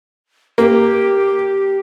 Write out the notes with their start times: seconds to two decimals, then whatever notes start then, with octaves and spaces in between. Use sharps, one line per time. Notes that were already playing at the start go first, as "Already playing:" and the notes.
0.58 A#3 G4